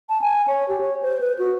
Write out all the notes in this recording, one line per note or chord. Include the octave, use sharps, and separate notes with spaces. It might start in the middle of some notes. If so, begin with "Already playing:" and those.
A5
G#5
C#5
G4
C#5
C5
B4
F#4